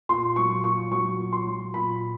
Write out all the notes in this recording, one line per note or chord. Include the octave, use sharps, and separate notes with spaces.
A#2 C6
F#3 C#6
A#2 C#6
F#3 C#6
A#2
C6
F#3
A#2 B5